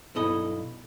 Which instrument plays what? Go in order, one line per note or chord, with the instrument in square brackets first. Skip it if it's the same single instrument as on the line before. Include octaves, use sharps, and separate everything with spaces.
[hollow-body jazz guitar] B1 G2 E4 A4 D#5 B5